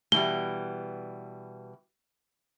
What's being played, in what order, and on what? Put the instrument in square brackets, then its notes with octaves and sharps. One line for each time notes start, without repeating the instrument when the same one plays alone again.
[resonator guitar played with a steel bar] B2 E3 G3 [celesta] G7